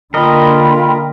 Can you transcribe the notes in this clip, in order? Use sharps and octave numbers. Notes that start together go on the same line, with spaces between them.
D3 A#3 F4 A#4 D#5 G5 B5